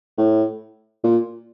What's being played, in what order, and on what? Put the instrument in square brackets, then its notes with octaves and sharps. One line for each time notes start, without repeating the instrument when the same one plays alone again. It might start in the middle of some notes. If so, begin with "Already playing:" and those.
[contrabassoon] A2
A#2